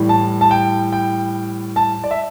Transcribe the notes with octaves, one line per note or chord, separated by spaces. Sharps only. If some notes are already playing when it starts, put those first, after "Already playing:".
Already playing: A2 E3 G3
A5
A5
G5
G5
A5
D5
E5